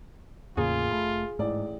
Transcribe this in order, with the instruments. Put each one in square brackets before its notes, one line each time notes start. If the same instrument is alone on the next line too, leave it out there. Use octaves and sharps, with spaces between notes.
[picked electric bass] E2 A2 A#3 [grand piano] C#3 [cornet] F4 [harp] G#4
[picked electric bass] F1 A3 [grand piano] B5
[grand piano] A1 D5 [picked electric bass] G#2